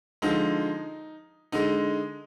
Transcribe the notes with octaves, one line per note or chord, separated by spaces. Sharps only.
D3 F3 G#3 D#4
D3 G#3 D#4